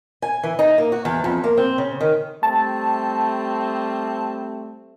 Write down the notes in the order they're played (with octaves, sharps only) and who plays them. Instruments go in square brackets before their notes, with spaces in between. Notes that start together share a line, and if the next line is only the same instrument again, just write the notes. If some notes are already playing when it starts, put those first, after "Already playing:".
[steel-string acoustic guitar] G#5
E3
D#4
A#3
F#4
E2
F2
A#3
C4
C#3
D#3
[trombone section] G3 A3 C4 [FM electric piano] A5